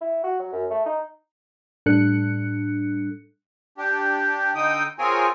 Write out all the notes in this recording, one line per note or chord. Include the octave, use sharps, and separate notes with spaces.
E4
F#4
F#3
F#2
A3
D#4
A2 G3 D4 A4 F#6 C#7
D4 G4
D3 D#4 G5 D#6
C4 F4 G#4 A#4 C#5 G#5